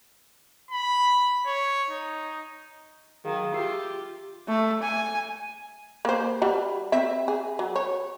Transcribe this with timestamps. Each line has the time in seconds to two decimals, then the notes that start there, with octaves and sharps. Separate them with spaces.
0.71 B5
1.46 C#5
1.91 D#4
3.25 D#3 F#3 G#4 F5
3.54 F4 G4 E5 E6 C7
4.48 A3
4.83 G#5
6.05 A#3 C5
6.42 G3 F#4
6.92 C4 E5
7.28 G#4
7.59 F#3
7.76 C#5